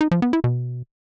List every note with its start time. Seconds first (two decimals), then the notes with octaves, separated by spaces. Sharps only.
0.01 D#4
0.11 F3
0.22 B3
0.33 E4
0.44 B2